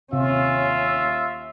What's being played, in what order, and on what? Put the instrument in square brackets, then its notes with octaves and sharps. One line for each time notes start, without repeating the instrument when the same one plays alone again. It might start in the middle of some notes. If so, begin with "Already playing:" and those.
[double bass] D#2 C#4 [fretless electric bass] C3 [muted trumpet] F4 [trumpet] E5